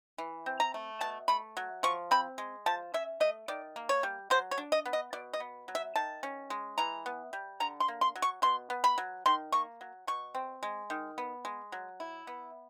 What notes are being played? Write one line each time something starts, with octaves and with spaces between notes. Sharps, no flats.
E3
C4
A#5
A3
B2 A5
A3 B5
F#3
F3 C#6
C4 B5
G#3
F3 A5
C#4 E5
A3 D#5
D#3 D5
A#3
C#5
G3
F#3 C5
C#5
D4
D#5
B3
D#5
B2 D5
D#5
B3
F#3
E5
D#3 A5
C#4
G#3
E3 A#5
B3
G3
D3 A#5
C6
A#3
C6
F#3
C#6
B2 C6
B3
B5
F#3
D#3 C6
A#3 C#6
F#3
B2 C#6
C4
G#3
D#3
B3
G#3
F#3
E4
B3